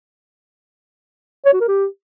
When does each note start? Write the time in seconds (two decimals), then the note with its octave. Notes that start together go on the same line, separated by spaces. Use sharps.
1.46 C#5
1.53 F#4
1.61 A#4
1.68 G4